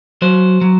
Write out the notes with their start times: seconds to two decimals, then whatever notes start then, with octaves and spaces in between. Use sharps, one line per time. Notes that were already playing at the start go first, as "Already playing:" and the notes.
0.22 F#3 C5
0.61 F#3